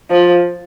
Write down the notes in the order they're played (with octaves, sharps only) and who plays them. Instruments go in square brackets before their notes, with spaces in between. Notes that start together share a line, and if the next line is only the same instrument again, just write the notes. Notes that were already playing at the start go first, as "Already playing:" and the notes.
[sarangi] F3